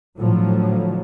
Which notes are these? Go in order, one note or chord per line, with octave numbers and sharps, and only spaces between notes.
A2 D3 F3 F#3